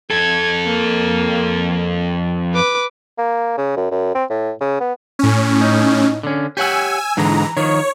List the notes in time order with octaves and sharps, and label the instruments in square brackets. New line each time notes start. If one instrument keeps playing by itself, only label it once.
[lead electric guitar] F2 A4 [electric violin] G#6
[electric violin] A#3
B4 D6
[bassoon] A#3
C#3
F#2
F#2
C4
A2
C#3
B3
[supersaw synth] A2 C#4
[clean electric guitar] D#4
D3 C#4
[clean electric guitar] G4 C#5 F#5 [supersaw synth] G#5 E6
[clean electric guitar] G#2 D3 G#3 [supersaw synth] E3 A#5
[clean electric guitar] D#3 F3 [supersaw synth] C#5